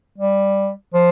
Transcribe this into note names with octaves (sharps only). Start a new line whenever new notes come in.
G3
F3